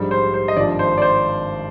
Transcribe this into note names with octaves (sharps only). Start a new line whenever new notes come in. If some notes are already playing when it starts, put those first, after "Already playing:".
Already playing: A#1 G#2 G3
C5
C5
D#5
G#1 G2 F3 D5
C5
D5
C5